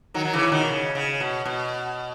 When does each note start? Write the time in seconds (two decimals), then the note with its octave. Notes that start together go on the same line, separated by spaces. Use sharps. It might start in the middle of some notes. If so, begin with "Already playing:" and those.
0.14 D#3 F#3
0.25 F#3
0.33 C#3 E3
0.48 C#3
0.52 B2 D#3
0.70 C#3
0.95 C#3
1.20 B2
1.45 B2